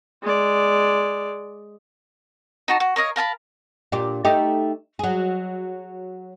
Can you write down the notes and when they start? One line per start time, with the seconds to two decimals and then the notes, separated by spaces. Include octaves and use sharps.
0.23 G#3 D5
2.68 D#4 F#4 A5
2.80 F#4
2.96 A#4 C#5 D#5 F5
3.16 A#4 F5 A5 B5
3.92 A#2 D4 G4
4.25 A3 D#4 G4
4.99 F#3 G#4